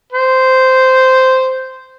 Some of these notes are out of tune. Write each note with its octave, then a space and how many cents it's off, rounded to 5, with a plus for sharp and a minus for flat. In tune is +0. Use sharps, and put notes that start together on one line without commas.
C5 -10